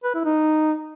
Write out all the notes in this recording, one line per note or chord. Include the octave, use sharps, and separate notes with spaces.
B4
E4
D#4